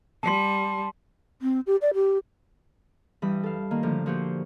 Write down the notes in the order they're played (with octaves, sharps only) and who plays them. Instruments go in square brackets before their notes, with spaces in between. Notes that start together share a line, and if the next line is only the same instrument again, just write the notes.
[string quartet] G3 [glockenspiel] A5 C6
[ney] C4
G4
D5
G4
[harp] G2 E3 G3 B5 D#6
A4 F5
D#3 A#3
A2 D3 F3 A3
A#2 F3 F#4 G4 C5